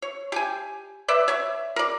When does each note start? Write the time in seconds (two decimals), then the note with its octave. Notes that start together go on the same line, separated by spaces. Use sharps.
0.02 C#5
0.32 G4 G5 G#5
1.08 B4 D5 E5
1.28 C#5 E5
1.76 A#4 D5